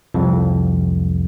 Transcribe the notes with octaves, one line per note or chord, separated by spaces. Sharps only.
C2 F2